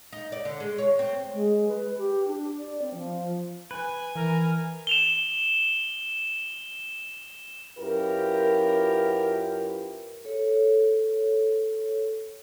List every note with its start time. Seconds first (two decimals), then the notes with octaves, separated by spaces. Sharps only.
0.13 D#4
0.32 D5
0.45 D3
0.60 G#3
0.78 C#5
0.99 C4
1.34 G#3
1.68 B4
1.98 G4
2.28 D4
2.58 D5
2.82 C4
2.94 F3
3.71 B4 G#5
4.15 E3 A#4
4.87 E7 F7 G7
7.78 F#2 E4 F4 G4 A#4 B4
10.25 A4 C#5